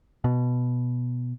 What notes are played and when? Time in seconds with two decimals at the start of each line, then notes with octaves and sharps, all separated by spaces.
0.24 B2